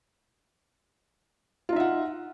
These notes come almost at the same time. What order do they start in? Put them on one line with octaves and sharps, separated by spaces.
F4 D#4 E5 F#5